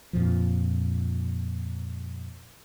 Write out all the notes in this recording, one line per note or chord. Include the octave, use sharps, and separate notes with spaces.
F2 A#2 F3